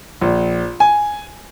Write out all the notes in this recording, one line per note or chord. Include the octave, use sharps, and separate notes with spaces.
A#1
G#5